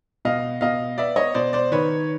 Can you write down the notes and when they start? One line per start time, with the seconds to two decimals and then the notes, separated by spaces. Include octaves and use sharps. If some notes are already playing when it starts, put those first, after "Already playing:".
0.25 B2 D#5 F5
0.61 B2 D#5 F5
0.98 B3 D5 E5
1.16 C#5 D#5
1.34 B2 C5 D5
1.53 C5 D5
1.71 D#3 B4 C#5